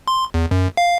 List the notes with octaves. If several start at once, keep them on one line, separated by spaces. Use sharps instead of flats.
C6
E2
F#2
F5